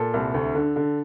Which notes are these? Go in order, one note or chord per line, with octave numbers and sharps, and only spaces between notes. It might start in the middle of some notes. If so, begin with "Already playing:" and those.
Already playing: A#2 A4
C2
D2
D3
D3